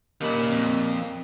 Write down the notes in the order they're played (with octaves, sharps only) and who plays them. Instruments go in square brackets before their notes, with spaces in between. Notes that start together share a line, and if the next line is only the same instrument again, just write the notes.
[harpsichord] D#2 A#2 [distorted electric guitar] C#3 B5
[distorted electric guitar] F2